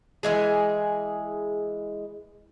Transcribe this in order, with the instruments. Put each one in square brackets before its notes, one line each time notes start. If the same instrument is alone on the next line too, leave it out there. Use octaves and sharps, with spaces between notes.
[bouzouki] E3 G#3 G#4